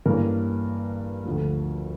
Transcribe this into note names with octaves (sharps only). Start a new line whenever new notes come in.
G2 E3 A#3 C#4 A#4
D2 D3 F3